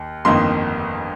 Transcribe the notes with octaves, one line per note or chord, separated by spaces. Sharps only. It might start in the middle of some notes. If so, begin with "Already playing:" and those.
Already playing: D#2
G1 F2 D#3 A#3 C6